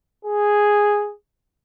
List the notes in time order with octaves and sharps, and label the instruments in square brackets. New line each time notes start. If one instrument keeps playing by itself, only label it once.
[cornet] G#4